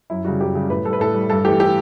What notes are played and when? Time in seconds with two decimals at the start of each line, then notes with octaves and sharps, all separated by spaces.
0.10 F#2 E4
0.25 C#3 G3 F#4
0.40 F#2 G4
0.55 C#3 G3
0.69 A2 B4
0.85 G3 A4
0.93 B4
1.00 A2 A4
1.14 G3
1.30 G2 A4
1.45 E3 A3 G4
1.60 G4